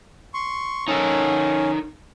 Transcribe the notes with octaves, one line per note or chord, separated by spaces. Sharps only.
C6 C#6
C#4 D#4 A4 A#4